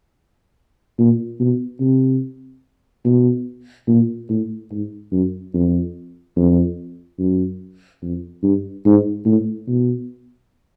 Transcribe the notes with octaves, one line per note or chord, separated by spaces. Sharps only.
A#2
B2
C3
B2
A#2
A2
G#2
F#2
F2
F2
F#2
F2
G2
G#2
A2
B2